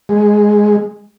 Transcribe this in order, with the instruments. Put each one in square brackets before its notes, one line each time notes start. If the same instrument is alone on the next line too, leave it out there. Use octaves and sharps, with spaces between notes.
[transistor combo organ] G#3